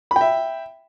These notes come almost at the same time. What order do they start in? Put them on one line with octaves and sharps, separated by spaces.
B5 G5 E5